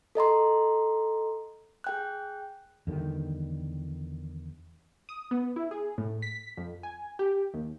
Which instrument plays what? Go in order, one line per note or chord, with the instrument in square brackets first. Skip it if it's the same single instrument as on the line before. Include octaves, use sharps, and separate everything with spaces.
[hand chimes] A4 D#5 A#5 C6
G#4 G5 F#6
[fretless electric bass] E2 D3 D#3 G3
[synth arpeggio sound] D#6
B3
E4
G#4
A2
B6
F2
G#5
G4
D#2